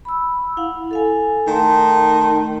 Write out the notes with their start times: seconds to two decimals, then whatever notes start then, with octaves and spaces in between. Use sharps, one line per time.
0.05 B5 E6
0.57 E4 F5 F#5
0.91 A4 F5 G#5
1.47 D#3 A3 A5 C6